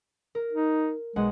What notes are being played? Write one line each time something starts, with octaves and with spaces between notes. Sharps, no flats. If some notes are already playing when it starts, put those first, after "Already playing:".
A#4
D#4
B1 G#3 F#5 G#5